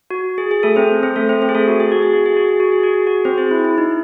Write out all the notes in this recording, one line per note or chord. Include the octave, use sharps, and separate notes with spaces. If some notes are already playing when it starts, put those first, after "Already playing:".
F#4
G#4
G#4
A3 A4
C4 C5
C4 C5
A3 A4
C4 C5
C4 C5
G#4
A3 A4
F#4
G#4
F#4
G#4
F#4
G#4
F#4
G#4
F#4
G#4
F#4
G#4
F#4
C4 C5
G#4
E4
E4
D#4